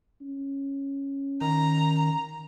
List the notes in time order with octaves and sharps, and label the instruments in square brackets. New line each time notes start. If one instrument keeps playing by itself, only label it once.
[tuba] C#4
[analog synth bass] D#3 [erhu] A#5